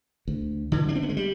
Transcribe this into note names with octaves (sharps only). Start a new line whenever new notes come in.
D2
D3
D4
C4
B3
G#3
G3